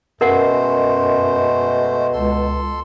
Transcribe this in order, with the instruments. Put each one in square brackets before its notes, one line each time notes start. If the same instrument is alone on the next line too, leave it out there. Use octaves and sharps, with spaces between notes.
[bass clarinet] F#2 [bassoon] B2 [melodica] G#3 A3 C5 [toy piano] A#4 F#5
[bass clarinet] C#2 [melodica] A4 C6